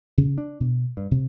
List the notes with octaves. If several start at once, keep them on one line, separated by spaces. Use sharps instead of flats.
C#3
D4
B2
G2
C3